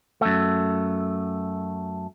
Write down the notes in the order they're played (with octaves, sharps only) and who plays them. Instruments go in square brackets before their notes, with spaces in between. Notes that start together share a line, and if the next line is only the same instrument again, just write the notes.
[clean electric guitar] F#2 A3